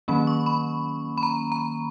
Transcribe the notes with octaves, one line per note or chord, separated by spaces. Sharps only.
D#3 F#3 A#3 C#4 B5
C#6
B5
B5
A#5
A#5